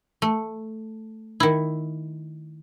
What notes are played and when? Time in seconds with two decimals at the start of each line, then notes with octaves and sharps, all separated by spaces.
0.22 A3
1.40 D#3 E4